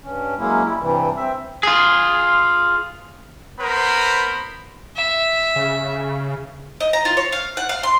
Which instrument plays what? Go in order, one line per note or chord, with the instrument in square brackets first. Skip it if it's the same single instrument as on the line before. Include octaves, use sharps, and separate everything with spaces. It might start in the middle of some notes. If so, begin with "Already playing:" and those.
[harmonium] G2 C#4
F#3 G#3 A#3 C#4 E4
G3 E4
G2 C3 E3 G3
C4 E5
[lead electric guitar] F4 G#4
[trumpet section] B3 A#4 C5 B5
[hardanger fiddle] E5
[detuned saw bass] C#3
[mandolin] D#5
A#5
F4
C#5
F5
F#5
F5
C6